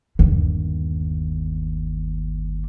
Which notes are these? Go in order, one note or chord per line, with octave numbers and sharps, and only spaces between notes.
G1 D#2